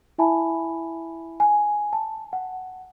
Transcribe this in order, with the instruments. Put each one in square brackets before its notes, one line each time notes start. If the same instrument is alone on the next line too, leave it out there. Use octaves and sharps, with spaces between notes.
[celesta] E4 E5 G#5 A5 B5
G#5
A5
F#5